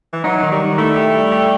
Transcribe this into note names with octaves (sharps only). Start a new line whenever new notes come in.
E3
F#3 D#4
D#3
G3
D#3
A3 E4
G4
G3
G4